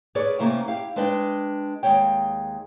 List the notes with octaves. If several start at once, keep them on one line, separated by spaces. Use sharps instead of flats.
G#4 A#4 B4 C#5 D5
C3 E3 A3 A#3 C#4 A#4
E4 G4 F5
G#3 D4 B4 D#5 E5 G5
D#2 F3 G#3 C#5 G5